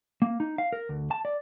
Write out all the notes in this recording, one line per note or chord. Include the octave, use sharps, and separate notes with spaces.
A#3
D#4
F5
A#4
D2
A5
D5